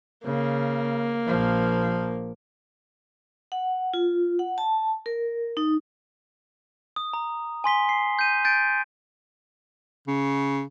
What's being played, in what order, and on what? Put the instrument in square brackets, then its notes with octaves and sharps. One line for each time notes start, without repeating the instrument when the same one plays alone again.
[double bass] C#3 [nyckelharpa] A#3
[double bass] A#1 F3
[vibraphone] F#5
F4
F#5
A5
A#4
D#4
[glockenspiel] D#6
A#5
G#5 C6 B6 G7
C7
G6 D#7
G6 A6 D7
[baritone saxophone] C#3